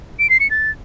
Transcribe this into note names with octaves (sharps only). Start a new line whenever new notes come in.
D7
C7
C#7
A6